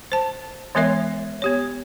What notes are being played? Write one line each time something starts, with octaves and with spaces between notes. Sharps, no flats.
C5 A5
E3 G#3 B3 A#4 C#5 E5
B3 G4 C#5